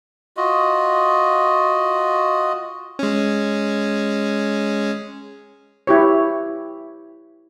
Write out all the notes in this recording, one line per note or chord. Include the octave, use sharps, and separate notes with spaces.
F4 F#4 D#5
G#3 C#4
E4 G4 C#5